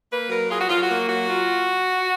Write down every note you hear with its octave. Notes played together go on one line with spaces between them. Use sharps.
A#3 B4
F#3 A#4
F4 G#4
F#4
F#3 F4
F#4
A#3
F#3 F#4
F4